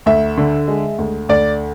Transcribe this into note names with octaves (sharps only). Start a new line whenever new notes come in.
D2 E5
D3
G#3
D2
D2 D5